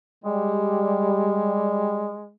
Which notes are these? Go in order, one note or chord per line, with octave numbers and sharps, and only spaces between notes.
G3 G#3